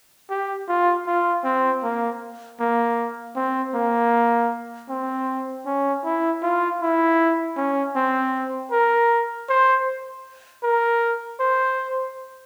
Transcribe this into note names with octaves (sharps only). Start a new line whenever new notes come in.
G4
F4
F4
C4
A#3
A#3
C4
A#3
C4
C#4
E4
F4
E4
C#4
C4
A#4
C5
A#4
C5